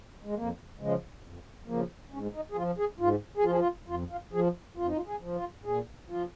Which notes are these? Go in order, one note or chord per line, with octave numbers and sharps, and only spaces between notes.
G#3
F2 A#3
C#3 F3 G#3
F2
C#3 F3 A#3
G#2 C#4
D#4
G#4
F3 F4
G#4
G#2 F4
G#4
F3 F4
G#4
F4
F2 F4
F4
F3 G#4
F2 F4
D#4
F4
G#4
F3
F4
A#2 G#4
F3 F4